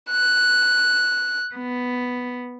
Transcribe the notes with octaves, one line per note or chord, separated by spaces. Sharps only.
F#6
B3